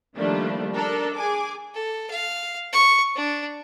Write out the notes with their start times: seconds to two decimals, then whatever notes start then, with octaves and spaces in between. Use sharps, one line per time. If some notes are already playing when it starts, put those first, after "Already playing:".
0.16 D#3 F3 G3 A3 A#3 D4
0.74 D4 A4 A#4
1.16 G#4 G#5 D6
1.74 A4
2.10 F5
2.73 C#6
3.16 D4